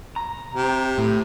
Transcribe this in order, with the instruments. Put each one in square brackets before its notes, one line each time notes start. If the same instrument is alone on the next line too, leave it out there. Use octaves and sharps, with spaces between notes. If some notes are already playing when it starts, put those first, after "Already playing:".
[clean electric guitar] A#5
[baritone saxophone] C3
[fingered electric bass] A2